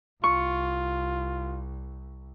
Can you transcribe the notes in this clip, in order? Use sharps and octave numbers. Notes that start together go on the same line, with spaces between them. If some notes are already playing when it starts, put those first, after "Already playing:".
C2 F4 C#6